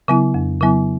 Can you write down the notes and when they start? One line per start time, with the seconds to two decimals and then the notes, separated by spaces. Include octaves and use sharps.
0.08 C#3 F#3 B3 E4
0.34 F2
0.61 C#3 F#3 B3 E4